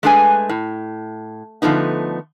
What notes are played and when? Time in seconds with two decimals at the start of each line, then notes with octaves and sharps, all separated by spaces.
0.03 G#3 A3 D4 G#4 B4 G#5
0.49 A2
1.62 D3 F3 A3 B3 D#4